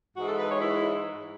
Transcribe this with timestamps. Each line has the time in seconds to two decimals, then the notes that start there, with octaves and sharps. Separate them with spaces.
0.15 G#2 E3 G#3 F#4
0.27 A4
0.38 B4
0.49 C#5
0.61 E4